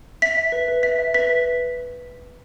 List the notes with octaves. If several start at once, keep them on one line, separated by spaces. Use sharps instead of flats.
E5 B6
E5
B4
B4
E5 B6
E5
B4 B6
B4